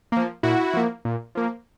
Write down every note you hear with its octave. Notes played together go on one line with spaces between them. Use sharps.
F3 A#3
A#2 E4 F#4
F3 A#3
A#2
F3 A#3